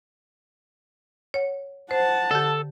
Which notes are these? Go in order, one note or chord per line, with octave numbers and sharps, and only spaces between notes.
C#5 F#5
C5 F#5 A5
D3 G4 A4